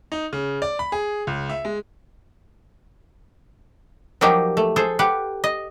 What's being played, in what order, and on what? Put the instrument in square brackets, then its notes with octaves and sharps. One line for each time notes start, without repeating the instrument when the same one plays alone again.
[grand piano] D#4
C#3
D5
B5
G#4
C#2
E5
G#3
[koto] F3 F#3 A#3 D#4 G4
A3
G#4 A4 C5
G4 B4 F#5
D#5